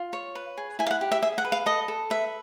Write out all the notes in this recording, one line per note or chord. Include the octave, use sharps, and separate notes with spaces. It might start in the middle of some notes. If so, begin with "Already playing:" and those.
Already playing: F4
C#5
B4
G#4
E4 G#5
F5
F#5
G4
E5
G#4 E5
F#5
B4
F5
A4 D#5
A4
B4 E5